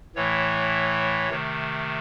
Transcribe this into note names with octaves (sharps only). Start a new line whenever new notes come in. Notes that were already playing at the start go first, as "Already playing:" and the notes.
A2 E3 A3 C#5
C3 D#3 A3